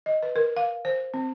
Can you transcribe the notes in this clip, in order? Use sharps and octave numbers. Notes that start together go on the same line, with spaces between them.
D#5
B4
A#4
F5
C5
C4